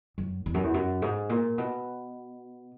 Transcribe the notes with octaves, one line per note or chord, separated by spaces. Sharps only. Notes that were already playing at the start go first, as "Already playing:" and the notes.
F#2
E2
F#2
E2
F#2
G#2
A#2
B2